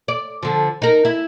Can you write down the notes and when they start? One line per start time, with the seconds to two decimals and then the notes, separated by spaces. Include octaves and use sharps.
0.08 D5
0.43 D3 F3
0.82 D#4 A#4
1.05 E4